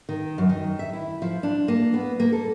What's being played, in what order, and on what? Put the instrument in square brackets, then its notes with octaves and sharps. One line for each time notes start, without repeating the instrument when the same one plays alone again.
[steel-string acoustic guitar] D#3
F#2
D#3
E5
E4
F3
D4
A#3
B3
A#3
A4